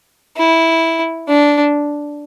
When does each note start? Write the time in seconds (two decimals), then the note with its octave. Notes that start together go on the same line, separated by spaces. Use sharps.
0.37 E4
1.28 D4